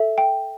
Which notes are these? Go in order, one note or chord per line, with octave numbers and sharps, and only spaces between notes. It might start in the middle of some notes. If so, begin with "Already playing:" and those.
Already playing: A4 E5
G5